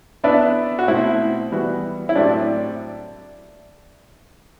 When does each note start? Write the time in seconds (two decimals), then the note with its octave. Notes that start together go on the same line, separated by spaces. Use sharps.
0.24 B3 D4 E4 B4 E5
0.79 F#4
0.88 B2 A3 C4 E4
1.52 E3 G3 B3 F#4
2.09 E4
2.15 A2 F#3 C4 D4 G4 D5